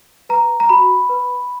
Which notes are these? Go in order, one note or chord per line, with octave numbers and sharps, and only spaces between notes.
B4 A#5
A#5
F#4 B5
B4